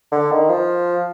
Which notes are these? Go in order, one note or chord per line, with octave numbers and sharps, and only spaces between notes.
D3
D#3
F3